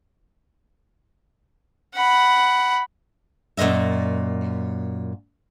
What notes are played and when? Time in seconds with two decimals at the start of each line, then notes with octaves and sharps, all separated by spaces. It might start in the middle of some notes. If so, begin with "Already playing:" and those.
1.94 F#5 B5
3.57 F#2 A#2 G#3 D#5 E5